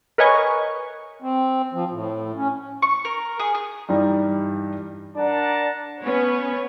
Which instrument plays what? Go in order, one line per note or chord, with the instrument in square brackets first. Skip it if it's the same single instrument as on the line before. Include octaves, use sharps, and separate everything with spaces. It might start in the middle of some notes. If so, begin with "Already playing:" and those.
[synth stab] A#4 B4 C#5 D#5 G#5 C#6
[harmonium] C4
F3
A2
C#4
[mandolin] C#6
A#4
G#4
G#4
[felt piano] G2 E3 G3 D#4
[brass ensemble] D4 A#4 D5 F#5 A5 A#5
[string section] B3 C#4 B4 C#5